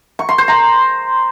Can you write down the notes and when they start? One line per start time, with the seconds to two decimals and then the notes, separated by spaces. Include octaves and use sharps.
0.19 C#6
0.29 C6
0.38 C5
0.48 A#5